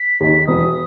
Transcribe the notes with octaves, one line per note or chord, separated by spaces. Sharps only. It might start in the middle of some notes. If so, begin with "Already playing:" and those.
Already playing: B6
D#2 D#3
E1 D#6